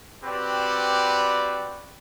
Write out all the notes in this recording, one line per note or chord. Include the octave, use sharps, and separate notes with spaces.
C4 F#4 G4 B4 D5